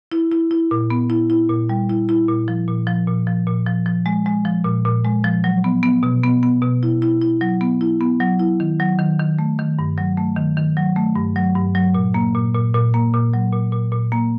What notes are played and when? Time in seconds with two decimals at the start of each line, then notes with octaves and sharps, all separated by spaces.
0.12 E4
0.32 E4
0.51 E4
0.71 A#2
0.90 B3
1.10 E4
1.30 E4
1.50 A#2
1.69 G3
1.90 E4
2.09 E4
2.29 A#2
2.48 F3
2.68 A#2
2.87 F3
3.07 A#2
3.27 F3
3.47 A#2
3.67 F3
3.86 F3
4.06 G#3
4.26 G#3
4.45 F3
4.65 A#2
4.85 A#2
5.05 G#3
5.24 F3
5.44 F#3
5.64 B3
5.83 B3
6.03 B2
6.24 B3
6.43 B3
6.62 B2
6.83 E4
7.02 E4
7.21 E4
7.41 F#3
7.61 B3
7.81 E4
8.01 B3
8.20 F#3
8.40 E4
8.60 D#3
8.80 F#3
8.99 D#3
9.19 D#3
9.39 A3
9.59 D#3
9.79 G2
9.98 F#3
10.17 A3
10.37 D#3
10.57 D#3
10.77 F#3
10.96 A3
11.16 G2
11.36 F#3
11.56 G2
11.75 F#3
11.94 A#2
12.14 A#3
12.35 A#2
12.55 A#2
12.74 A#2
12.94 A#3
13.14 A#2
13.33 F#3
13.52 A#2
13.72 A#2
13.92 A#2
14.12 A#3